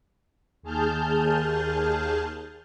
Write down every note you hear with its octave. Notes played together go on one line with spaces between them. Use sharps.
D#2 G#4 A5 F6 G6